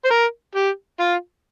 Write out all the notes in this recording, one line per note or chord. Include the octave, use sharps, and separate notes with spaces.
C5
A#4
G4
F4